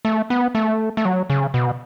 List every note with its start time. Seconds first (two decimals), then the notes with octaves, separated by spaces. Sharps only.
0.05 A3
0.30 B3
0.55 A3
0.97 A3
1.05 F#3
1.30 C#3
1.54 B2